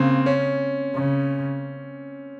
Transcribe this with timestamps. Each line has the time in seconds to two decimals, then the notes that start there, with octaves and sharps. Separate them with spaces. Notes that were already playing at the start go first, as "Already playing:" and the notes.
Already playing: C#3 A#3 C4
0.26 C#4
0.95 C#3